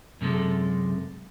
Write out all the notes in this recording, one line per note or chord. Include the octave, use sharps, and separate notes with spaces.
F#2 C3 G#3 A4